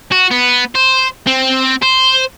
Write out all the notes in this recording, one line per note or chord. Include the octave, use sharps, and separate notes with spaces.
F#4
B3
C5
C4
C5